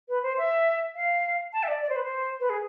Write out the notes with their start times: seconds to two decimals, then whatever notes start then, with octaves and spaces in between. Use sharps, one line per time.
0.09 B4
0.23 C5
0.38 E5
0.95 F5
1.53 A5
1.63 E5
1.68 D5
1.82 D5
1.89 C5
1.96 B4
2.03 C5
2.40 B4
2.50 G#4